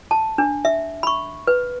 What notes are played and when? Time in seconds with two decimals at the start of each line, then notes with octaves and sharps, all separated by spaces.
0.11 A5
0.38 D4
0.65 E5
1.03 B5 C#6
1.47 B4